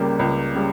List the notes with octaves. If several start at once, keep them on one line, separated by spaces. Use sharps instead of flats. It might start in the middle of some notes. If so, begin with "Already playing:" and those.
Already playing: C#2 C#3 G3 A#3 G4
C#2
C#3 G3